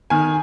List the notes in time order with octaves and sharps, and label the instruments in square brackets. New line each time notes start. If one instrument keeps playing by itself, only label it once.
[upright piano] D#3 G#5